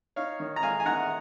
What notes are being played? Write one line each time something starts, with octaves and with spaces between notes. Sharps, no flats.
D#4 C#5 F5
D#3
A#5
G#3 F5 G#5
G#5
D#3 F#5 A#5